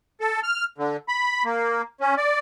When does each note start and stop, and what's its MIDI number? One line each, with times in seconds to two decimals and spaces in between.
0.21 0.40 69
0.43 0.64 89
0.78 0.97 50
1.08 1.43 83
1.45 1.82 58
2.01 2.15 61
2.17 2.39 74